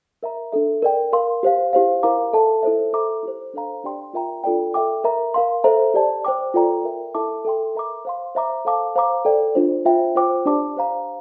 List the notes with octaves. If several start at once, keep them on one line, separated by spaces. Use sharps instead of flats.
A#4 E5 A#5
D4 A4 E5
A#4 D5 G5
A#4 F5 C6
G4 C5 F5
E4 G4 C5 F5
E4 A#4 F5 A#5 D6
A4 E5 A5
E4 A4 C5 E5
A4 E5 A#5 D6
E4 G4 C5
D4 A4 C5 F5 A#5
D4 G4 D5 G5 C6
F4 A#4 E5 G5 A#5
D4 F4 A4 D5 G5
A4 E5 G5 D6
A#4 E5 A#5
A#4 F5 C6
A4 C5 E5 A#5
G4 D5 A5
C5 G5 D6
F4 A4 D5 G5 A#5
A#4 E5 G5
E4 A4 E5 A5 D6
A4 E5 G5 C6
A#4 E5 A#5 D6
C5 F5 C6
C5 E5 A#5 D6
A4 C5 F5 A5 D6
C5 F5 A#5 D6
A4 D5 G5
D4 F4 C5
F4 C5 E5 G5
F4 C5 G5 D6
D4 G4 D5 A5 D6
G4 C5 F5 A#5